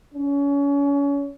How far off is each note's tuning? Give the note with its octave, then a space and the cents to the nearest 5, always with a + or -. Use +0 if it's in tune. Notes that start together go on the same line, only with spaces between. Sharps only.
C#4 +30